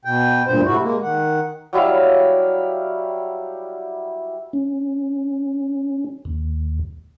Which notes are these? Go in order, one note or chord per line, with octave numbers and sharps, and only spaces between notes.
B2 G5
D2 G2 A#2 C5
A2 C3 E4 F#4
G#3 A#3
D#3 F#5
F#3 G3 E4 F5
C#4
D#2